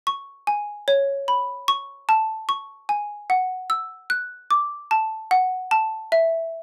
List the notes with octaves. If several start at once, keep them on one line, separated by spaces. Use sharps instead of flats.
C#6
G#5
C#5
B5
C#6
A5
C#6
G#5
F#5
E6
F#6
D6
A5
F#5
A5
E5